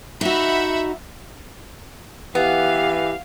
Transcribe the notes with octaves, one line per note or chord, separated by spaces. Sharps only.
D#4 F#4 E5 F#5 B5
E3 B3 G4 F5